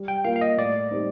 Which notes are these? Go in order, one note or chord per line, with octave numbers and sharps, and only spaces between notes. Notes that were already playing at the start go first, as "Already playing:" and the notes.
Already playing: G3
G5
A#3 F4 A#4 F5
F5
D#5
A2 D5
G3 C4 D#4